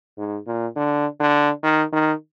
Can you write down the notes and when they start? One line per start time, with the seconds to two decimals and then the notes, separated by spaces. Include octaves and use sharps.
0.18 G#2
0.46 A#2
0.76 D3
1.20 D3
1.63 D#3
1.92 D#3